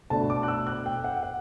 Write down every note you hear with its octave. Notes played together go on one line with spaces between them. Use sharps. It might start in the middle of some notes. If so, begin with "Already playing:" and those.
B2 A3 D4 A5
D6
F#6
E6
F#6
G5
F#5
F#5